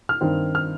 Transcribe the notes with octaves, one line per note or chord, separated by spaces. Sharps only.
F6
G2 D#3 C4
F6